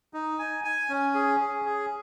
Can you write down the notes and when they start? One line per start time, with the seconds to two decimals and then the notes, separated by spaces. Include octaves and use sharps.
0.14 D#4
0.39 G#5
0.64 G#5
0.89 C#4
1.14 G#4
1.40 G#4
1.65 G#4